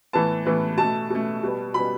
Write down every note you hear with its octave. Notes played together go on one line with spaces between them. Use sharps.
A2 E3 B3 A5
A2 E3 B3
B2 A3 A5
B2 A3
B2 G3 B3
B2 G3 B3 B5